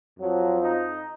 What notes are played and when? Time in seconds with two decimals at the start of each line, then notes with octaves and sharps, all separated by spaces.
0.19 F2 F3 F#3
0.62 D#4